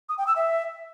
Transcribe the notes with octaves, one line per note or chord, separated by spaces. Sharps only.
D#6
G5
E6
E5